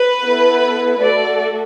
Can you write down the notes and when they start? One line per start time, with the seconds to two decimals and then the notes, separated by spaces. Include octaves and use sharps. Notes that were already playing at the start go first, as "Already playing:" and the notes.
Already playing: B4
0.23 B3 E4 A4
1.00 A3 F#4 A4 D5